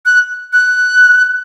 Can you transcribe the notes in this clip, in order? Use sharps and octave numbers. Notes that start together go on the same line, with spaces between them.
F#6
F#6